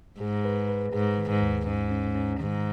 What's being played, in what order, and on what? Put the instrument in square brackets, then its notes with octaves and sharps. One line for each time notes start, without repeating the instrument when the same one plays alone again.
[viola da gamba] G#2 [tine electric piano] G#4
[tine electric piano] B4
B4
[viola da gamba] G#2 [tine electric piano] G#4
[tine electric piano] D#3
[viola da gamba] G#2
[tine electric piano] D#2
[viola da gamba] G#2 [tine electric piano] C#4
[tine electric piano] C#4
C#4
[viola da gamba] G#2 [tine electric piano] D#3